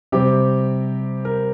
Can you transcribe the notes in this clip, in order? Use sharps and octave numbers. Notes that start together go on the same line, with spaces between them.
C3 G3 C4 G4
A#4